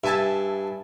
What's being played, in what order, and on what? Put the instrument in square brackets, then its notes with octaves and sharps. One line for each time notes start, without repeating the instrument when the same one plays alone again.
[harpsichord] G2 [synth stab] E5 G#5 A5